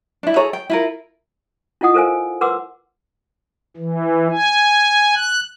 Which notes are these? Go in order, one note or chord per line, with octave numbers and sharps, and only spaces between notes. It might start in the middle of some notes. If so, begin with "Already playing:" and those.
D4 E4
G#4 A4 C#5 A#5
G5
E4 F4 A#4
E4 F4 D#5 F#5 D#6
A4 A#4 C5 F5 G#5
A#4 B4 F#5 C6 D6 E6
E3
G#5
F#6